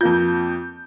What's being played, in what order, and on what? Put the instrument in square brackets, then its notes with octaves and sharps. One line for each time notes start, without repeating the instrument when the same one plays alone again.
[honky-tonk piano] F2 A#3 G6 [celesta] F4